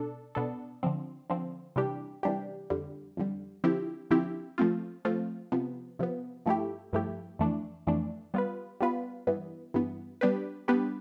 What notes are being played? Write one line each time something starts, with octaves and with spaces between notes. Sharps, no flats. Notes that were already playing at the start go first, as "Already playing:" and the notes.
Already playing: B2 D4 A4
B2 B3 D4 A4
D3 F3 C4
D3 F3 C4
C3 E3 G3 D4 G4
C3 E3 G3 D4 G4
F2 D3 G3
F2 D3 G3
D3 F3 C4 E4 G4
D3 F3 C4 E4 G4
F3 A3 C4 F4
F3 A3 C4 F4
C3 F3 B3
C3 F3 B3
G2 F3 A3 E4 G4
G2 F3 A3 E4 G4
F2 E3 A3 D4
F2 E3 A3 D4
G3 B3 F4 B4
G3 B3 F4 B4
G2 E3 B3
G2 E3 B3
G3 B3 D4 G4 B4
G3 B3 D4 G4 B4